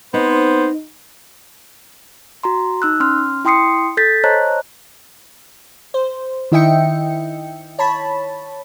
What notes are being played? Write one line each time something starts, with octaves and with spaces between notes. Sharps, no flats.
B3 C4 D#4 C5
F#4 A#5 C6
D#4 E6 F#6
C#4 C6 F6
E4 G5 C6 D#6 C7 C#7
A4 G6 A6 B6
C5 C#5 D#5 A5 A#5 F#6
C5
D#3 E4 D#5 E5 G5 C#7
C#5 A5 B5